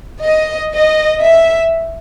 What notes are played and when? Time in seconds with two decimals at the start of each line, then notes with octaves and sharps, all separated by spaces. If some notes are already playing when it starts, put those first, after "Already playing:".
0.23 D#5
0.73 D#5
1.23 E5